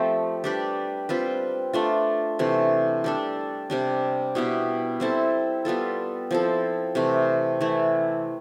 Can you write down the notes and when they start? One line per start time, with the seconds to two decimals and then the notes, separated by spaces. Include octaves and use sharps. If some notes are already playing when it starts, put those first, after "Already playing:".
Already playing: F3 A3 C4 G4
0.44 G3 D4 G4 B4
1.09 G3 C4 F4 B4
1.73 A3 D4 F4
2.39 C3 E3 A3
3.04 G3 D4 A4
3.70 C3 G3 D4
4.35 B2 B3 E4 G4
5.00 G3 C4 E4 A4
5.65 G3 B3 F4 A4
6.31 F3 C4 E4 A4
6.95 C3 E3 A3
7.61 E3 A3 E4